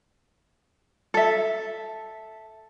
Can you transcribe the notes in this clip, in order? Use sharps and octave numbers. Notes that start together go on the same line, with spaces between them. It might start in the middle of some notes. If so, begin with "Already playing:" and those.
A4 E5